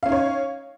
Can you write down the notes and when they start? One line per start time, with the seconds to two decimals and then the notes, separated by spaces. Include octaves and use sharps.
0.03 F5
0.06 C#4
0.09 D#4
0.12 C#5